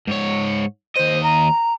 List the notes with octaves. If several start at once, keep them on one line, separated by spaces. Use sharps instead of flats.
G#2 C#5
D#2 C5 D#5
A#5